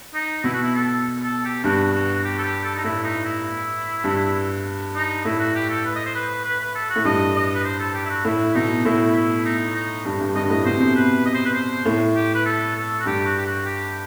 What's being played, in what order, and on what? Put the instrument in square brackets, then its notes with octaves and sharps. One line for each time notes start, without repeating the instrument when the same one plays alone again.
[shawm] D#4
[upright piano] B2 [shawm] E4
[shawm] F#4
E4
A4
A4
G4
[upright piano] G2 [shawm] F#4
[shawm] F#4
F#4
G4
A4
G4
A4
D#4
[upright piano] A2 [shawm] E4
[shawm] D#4
E4
[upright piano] G2
[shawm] D#4
[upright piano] A2 [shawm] E4
[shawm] F#4
G4
A4
B4
D#5
C5
B4
B4
B4
A4
F#4
[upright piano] A2
[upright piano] G2 [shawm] D#5
[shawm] D#5
B4
C5
A4
G4
E4
F#4
[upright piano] A2 [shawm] E4
[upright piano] B2 [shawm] D#4
[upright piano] A2 [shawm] E4
[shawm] E4
D#4
D#4
[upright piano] G2
G2
[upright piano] G2 [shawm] D#5
[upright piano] A2 [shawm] D#5
[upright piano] B2 [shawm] C5
[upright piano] C3
B2
[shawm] B4
D#5
C5
B4
C5
[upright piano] A2
[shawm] G4
B4
A4
A4
F#4
[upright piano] G2 [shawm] G4
[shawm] F#4
G4
F#4
G4